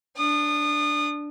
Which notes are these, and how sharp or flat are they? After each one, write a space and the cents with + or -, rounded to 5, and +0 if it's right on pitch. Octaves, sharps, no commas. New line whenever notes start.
D4 +0 D#6 -30